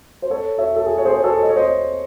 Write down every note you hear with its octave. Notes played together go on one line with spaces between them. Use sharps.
C5
A4 C#5
C#5 E5
A4
G#4
C#5
G#4 C5
C5
A4 C#5
D#5
C#5
C5 D#5